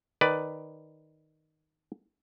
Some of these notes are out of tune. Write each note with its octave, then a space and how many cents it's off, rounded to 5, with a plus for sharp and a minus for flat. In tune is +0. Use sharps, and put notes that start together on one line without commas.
D#3 +0 B4 +10 D5 +0